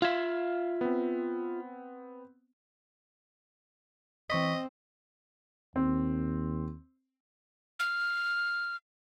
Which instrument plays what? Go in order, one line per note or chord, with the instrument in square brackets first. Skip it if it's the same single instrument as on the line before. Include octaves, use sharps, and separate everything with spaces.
[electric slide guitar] F4 E5 [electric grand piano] F5 G#6 E7
[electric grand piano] B3 C4
[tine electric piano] E3 C#6 B6 [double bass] C4 [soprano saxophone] D#5
[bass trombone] D#2 [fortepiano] C4
[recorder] F6